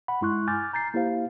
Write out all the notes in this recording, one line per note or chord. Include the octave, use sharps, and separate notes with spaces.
F#5 B5
G2 G#3 E4 C6 C#6 F#6
G#5 D6 F6 G6 A6
A#5 G6 A6 C7
A#3 E4 G4 C5 F5